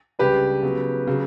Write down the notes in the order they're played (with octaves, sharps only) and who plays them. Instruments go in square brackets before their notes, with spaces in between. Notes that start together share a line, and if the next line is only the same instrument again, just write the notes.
[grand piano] C#2 C#3 G3 D4 [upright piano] G4 B4
[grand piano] C#3 F#3 B3 F#4
C#3 F#3